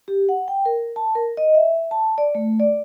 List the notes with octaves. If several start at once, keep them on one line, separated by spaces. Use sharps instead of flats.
G4
F#5
G5
A#4
A5
A#4
D#5
E5
A5
D5
A3
D5